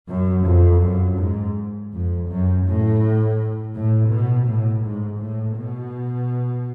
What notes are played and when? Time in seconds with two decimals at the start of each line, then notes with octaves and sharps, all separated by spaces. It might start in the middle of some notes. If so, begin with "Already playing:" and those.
0.09 F#2
0.46 F2
0.83 F#2
1.19 G#2
1.92 F2
2.29 F#2
2.65 A2
3.74 A2
4.10 B2
4.48 A2
4.84 G#2
5.20 A2
5.57 B2